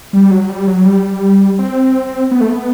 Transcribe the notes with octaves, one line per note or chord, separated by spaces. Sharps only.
G3
F#3
G3
F#3
G3
C4
B3
A3
B3